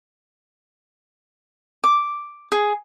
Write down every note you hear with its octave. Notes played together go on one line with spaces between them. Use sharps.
D6
G#4